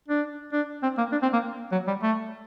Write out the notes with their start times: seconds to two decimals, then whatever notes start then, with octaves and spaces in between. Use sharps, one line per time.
0.08 D4
0.52 D4
0.83 C4
0.98 A#3
1.12 D4
1.22 C4
1.33 A#3
1.72 F#3
1.87 G3
2.03 A3